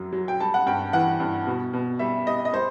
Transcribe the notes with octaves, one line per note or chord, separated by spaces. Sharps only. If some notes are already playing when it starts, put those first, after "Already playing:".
Already playing: F#2 F#3
F#3
G5
G3 A5
F#5
G2 G5
E3 F#5
G2
B2
B2
G3 E5
G3 D#5
D#5
G3 C5